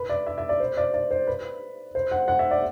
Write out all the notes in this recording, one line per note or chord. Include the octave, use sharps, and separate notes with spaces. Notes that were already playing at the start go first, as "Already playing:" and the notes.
Already playing: B4
D5
E5
E5
D5
C5
D5
D5
C5
B4
C5
F#5
F#5
E5
D5